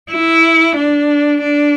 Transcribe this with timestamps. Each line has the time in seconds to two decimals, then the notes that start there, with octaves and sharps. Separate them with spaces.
0.12 E4
0.77 D4
1.42 D4